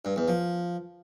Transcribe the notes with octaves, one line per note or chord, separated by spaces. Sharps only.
G2
E2
F3